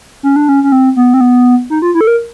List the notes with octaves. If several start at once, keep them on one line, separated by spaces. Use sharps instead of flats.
C#4
D4
C#4
C#4
C4
B3
C4
B3
D#4
F4
E4
A4
A#4